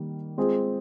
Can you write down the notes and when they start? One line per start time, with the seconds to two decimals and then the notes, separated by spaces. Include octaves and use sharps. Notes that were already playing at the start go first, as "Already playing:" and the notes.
Already playing: D#3 G3 A#3
0.38 G#3 C4 F4 G#4